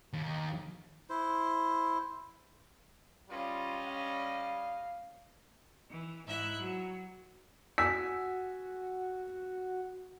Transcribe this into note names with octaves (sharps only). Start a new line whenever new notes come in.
D#2
E4 C5
G3 C#4 F4 D#5
F5
E3
G#2 E4 E5 F#6
F#3
F#4 G#5 E6 B6